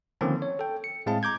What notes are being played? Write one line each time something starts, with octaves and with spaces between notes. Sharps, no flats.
D3 D#3 F3 A#3 C4 C#4
C#5
A4 G5
C#7
A2 G#3 C4 G#4 F5 A5
A#5 D6 G6 G#6